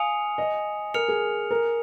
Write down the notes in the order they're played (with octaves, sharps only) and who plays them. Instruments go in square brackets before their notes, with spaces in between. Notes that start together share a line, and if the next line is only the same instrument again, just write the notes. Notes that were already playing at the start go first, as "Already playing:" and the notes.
Already playing: [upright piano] F5 [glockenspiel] G#5 D#6 C#7 F7
[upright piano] D#5
[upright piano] A#4 [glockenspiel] F6 C#7 F7
[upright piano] G#4
A#4